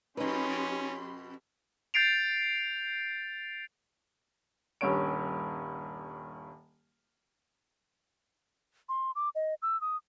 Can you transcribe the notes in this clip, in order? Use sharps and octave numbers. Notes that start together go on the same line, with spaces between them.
F2 B2 C#4 D#4 G4 B4 B5 C6
G6 A6 C7 D7 F7
D#1 G2 C#4 C#5 D7
C6
D6
D#5
E6
D#6